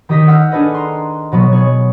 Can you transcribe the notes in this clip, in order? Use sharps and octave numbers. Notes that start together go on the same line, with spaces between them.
D#3 G4 D#5 D#6 B6
D#5 F#5 E6 F6 G6
D4 G#4 A4 B4 D#5
A#5 C6
B2 F#3 B3
G#4 C#5